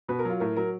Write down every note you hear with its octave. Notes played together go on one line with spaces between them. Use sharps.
B2 B4
A#4
F#3 F4
A2 A#4
F#3 A#4